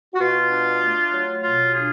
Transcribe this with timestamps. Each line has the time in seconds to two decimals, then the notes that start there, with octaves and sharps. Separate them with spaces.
0.14 F#4
0.20 B2 F4
0.51 D4
0.81 A3
1.12 F#3
1.42 B2 F4
1.73 D4 F4 G#4